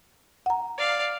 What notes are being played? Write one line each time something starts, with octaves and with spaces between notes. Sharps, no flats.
F#5 A#5
D5 F5